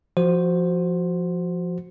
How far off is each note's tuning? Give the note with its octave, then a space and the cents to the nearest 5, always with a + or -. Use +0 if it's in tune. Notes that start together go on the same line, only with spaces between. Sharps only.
F3 +0 F#4 +0 C5 +0